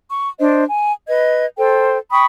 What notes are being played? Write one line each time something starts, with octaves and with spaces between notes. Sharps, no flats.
C#6
D4 C5 D#5
G#5
B4 D#5 G#6
A4 C5 G5
G5 B5 C#6 D#6